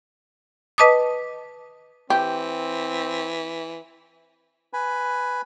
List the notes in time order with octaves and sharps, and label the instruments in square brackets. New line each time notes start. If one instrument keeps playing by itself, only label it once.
[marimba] B4 D#5 A5 D6 D#6
[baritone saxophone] E3 [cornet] C4 [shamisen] G4
[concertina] B4 G#5 B5